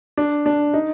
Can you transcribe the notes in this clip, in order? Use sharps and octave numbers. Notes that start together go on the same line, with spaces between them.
D4
D4
D#4